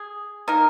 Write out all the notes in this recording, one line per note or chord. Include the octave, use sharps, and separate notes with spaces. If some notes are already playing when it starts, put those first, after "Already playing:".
Already playing: G#4
A#3 D#4 A#4